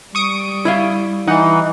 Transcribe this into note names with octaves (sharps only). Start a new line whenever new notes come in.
G3 C#6 D#6 D7
E4 E5 F5
E3 D#4 F#5